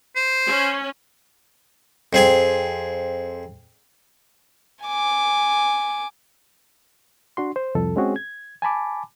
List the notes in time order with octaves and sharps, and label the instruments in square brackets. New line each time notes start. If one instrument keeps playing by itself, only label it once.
[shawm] C5
[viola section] C#4
[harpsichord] F2 C4 G#4 G#5
[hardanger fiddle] G#5 D6
[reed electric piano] D4 F#4 C6
C5
C2 F2 A4
G#3 C4 C#4 F#4 G#4
G#6
G#5 A5 B5 D6